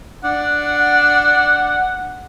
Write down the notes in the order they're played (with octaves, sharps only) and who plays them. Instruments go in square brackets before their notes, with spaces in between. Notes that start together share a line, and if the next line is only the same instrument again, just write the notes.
[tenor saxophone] D4 [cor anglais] F#5